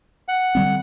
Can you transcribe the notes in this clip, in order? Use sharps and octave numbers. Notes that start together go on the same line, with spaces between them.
F#5
D3 G3 C4